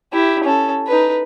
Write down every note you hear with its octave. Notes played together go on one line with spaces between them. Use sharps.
E4 G4
C#4 A4
D#4 B4